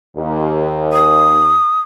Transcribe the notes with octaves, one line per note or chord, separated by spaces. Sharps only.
D#2
D#6